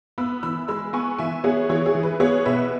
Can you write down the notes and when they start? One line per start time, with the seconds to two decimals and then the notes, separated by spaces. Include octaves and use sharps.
0.18 B3 B5 E6
0.43 E3 B5 E6
0.68 G#3 B5 E6
0.93 B3 G#5 C#6
1.18 E3 E5 G#5
1.44 B3 G#4 C#5
1.69 E3 G#4 C#5
1.86 G#4
1.95 E3
2.03 B4
2.20 B3 G#4 C#5
2.45 B2 B4 E5